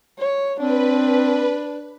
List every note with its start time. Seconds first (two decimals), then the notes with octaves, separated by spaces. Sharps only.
0.19 C#5
0.60 C4 D4 B4